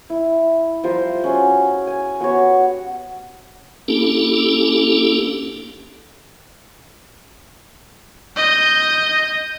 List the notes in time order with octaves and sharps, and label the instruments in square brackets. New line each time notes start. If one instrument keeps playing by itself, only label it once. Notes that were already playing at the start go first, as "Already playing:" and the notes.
[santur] E4
F3 G3 C5 A#5
C#4 F#4 G#4
G#5
B3 F#4 G4 C#5
[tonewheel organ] A#3 C#4 D4 E4 G4 A4
[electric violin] D#5 G6